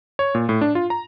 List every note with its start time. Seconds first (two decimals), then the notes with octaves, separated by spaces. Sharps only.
0.19 C#5
0.35 A#2
0.49 A2
0.61 D4
0.75 F4
0.90 A#5